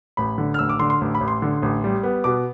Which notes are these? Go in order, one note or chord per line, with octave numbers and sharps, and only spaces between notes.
A1 B5
D3
F6
A1 E6
D6
D3 C6
C6
A1
B5
A1
C6
D3
A1
G3
B3
B2 D6